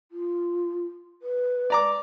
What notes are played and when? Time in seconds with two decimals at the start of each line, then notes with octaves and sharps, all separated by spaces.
0.12 F4
1.22 B4
1.70 D5 A#5 D6